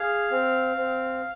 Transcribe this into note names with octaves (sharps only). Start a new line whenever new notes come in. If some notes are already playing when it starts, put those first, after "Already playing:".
Already playing: G#4 F5
C4
C4